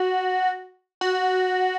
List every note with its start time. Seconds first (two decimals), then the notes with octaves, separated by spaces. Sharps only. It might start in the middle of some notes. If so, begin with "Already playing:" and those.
Already playing: F#4
1.01 F#4